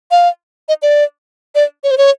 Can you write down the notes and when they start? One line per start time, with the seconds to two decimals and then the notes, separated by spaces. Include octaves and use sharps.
0.11 F5
0.69 D#5
0.82 D5
1.55 D5
1.84 C#5
1.91 C5
1.98 C#5